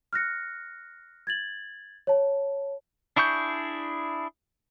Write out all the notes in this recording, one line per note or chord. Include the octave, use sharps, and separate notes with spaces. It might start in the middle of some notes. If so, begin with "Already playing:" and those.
F6 F#6 A#6 C#7
G#6 A6 F#7
C#5 A5
D4 E4 G#4 C#6 G6